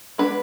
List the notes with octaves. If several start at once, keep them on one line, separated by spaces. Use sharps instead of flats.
G#3 B3 D4 B4